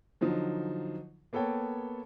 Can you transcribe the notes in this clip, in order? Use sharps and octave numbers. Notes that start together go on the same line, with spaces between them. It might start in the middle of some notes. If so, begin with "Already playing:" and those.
D3 F3 F#3 D#4
A#3 B3 A4 C#5 G5